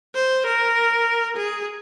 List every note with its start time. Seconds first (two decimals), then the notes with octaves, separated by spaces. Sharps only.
0.15 C5
0.46 A#4
1.36 G#4